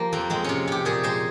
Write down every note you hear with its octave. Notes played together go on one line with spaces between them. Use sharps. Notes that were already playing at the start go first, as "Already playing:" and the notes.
Already playing: F3 A#3 F4 G4
F2 C4
G#3 C4
C3 C#4
C3 G4
A#2 G#4
G#3 C5